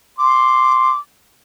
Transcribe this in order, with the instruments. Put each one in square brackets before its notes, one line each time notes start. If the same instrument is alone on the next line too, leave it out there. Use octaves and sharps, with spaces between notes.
[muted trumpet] C6 [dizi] D6